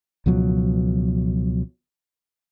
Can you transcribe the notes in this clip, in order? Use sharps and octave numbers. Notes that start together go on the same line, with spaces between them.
C#2 B2 F3 F#3